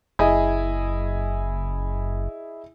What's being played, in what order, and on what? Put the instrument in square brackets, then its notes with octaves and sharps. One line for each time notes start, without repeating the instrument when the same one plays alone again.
[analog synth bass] F#1 [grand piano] E4 G#4 D#5